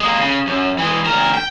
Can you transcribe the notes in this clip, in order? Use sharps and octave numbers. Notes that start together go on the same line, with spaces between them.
G#3 A#3
C#3
F#2
E3 G#3
D2 A#4
G5